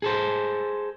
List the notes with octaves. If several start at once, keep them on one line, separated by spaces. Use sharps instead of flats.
G#4 A4 C5